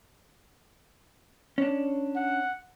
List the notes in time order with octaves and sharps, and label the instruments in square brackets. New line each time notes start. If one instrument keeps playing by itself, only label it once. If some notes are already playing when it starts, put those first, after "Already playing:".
[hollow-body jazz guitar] C#4 D4
[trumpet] F#5